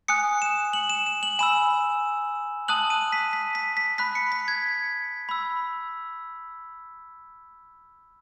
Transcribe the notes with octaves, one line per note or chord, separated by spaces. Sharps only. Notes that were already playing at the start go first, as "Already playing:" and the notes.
G#5 D#6 F#6 C#7
E7
F#7
E7
E7
F#7
G#5 B5 E6 E7
A5 D#6 F#6 F#7
D#7
B6
B6
B6
B6
B5 F#6 B6
C#7
B6
G#6
B5 E6